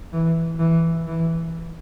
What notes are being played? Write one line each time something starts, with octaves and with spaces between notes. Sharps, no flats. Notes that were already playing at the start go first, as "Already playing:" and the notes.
E3
E3
E3